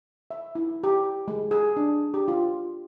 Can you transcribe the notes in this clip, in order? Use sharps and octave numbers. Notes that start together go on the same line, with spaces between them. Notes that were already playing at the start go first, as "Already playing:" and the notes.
E5
E4
G4
G#3
G#4
D4
G4
F4